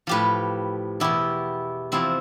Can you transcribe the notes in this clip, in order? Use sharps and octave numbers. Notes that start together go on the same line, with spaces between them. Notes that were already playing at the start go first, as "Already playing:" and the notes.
A2 F3 G4 B4
E2 B2 E4 G4
E2 C3 F3 C4 E4